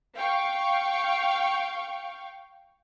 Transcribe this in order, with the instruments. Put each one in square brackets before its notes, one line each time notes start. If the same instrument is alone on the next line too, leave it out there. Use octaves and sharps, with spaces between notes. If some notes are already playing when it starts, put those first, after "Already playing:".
[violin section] F5 G5 C#6